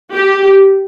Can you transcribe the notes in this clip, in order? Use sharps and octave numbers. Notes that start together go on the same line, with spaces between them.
G4